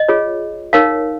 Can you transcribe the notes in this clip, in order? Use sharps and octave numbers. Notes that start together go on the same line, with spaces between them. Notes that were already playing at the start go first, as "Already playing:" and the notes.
Already playing: D#5
F4 G#4 C#5
D#4 A#4 C#5 F5